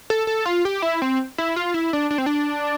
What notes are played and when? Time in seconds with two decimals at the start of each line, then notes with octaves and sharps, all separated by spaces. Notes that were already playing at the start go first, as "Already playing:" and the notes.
0.10 A4
0.27 A4
0.46 F4
0.65 G4
0.82 E4
1.02 C4
1.38 E4
1.56 F4
1.74 E4
1.93 D4
2.11 D4
2.18 C4
2.26 D4